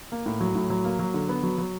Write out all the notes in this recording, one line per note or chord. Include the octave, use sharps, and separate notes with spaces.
A#3
A2
F#3
A2
F#3
A#3
F#3
D3
B3
F#3
F#3